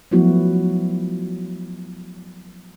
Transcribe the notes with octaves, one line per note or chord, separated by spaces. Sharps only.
F3 F#3 A3 B3 E4 F#4